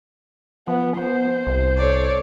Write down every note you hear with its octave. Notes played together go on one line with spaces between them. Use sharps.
F3 B3
B3 C5
C2
A4 C#5 D5